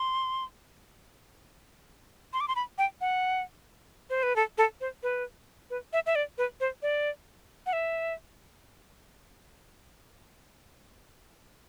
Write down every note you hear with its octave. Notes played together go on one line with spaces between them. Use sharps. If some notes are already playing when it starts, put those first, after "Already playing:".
Already playing: C6
C6
D6
C6
B5
G5
F#5
C5
B4
A4
A4
C5
B4
B4
E5
E5
D5
B4
C5
D5
F#5
E5